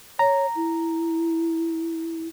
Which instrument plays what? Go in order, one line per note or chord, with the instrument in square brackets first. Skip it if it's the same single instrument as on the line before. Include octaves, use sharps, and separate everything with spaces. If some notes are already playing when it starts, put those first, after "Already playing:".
[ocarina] C#5 [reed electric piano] A#5
[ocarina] E4